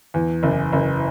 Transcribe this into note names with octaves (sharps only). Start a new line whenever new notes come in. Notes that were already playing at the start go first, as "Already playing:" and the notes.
E2
F#1
F#1